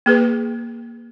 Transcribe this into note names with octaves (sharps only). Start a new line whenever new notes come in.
A#3 G#4 B4